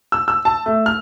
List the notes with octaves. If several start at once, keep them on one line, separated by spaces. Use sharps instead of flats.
E6
E6
A5
A3
F6